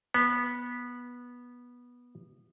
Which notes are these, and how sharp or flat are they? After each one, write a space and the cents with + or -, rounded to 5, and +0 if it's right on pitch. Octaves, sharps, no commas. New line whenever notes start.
B3 -15